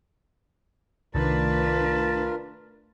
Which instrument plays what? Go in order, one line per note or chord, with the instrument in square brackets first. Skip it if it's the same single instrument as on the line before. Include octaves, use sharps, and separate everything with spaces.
[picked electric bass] C2 D#3 [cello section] A3 D4 B4 [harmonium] F4 A#4 [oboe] A5